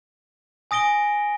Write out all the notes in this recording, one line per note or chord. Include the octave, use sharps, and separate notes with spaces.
G#5 D#6 A#6 D7 G7